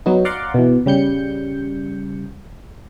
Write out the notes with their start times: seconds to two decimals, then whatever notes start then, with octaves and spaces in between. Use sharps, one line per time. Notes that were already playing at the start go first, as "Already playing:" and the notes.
0.06 F#3 B3 D#4
0.25 D5 F5 F#5 A#5 C6 D6
0.54 B2 E3
0.86 C#3 G3 G6 C#7